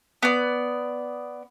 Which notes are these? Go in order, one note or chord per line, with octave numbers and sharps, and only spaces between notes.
B3 D5